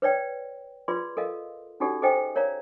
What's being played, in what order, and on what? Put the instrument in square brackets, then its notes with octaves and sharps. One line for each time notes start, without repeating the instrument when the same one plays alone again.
[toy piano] B4 C#5 D5 G5
F4 G#4 B4 D5 C6
A4 A#4 D#5 F5
C#4 D#4 F#4 G4 A4 D5
G#4 A4 C5 D#5 G5 G#5
A#4 C#5 D5 F5 A#5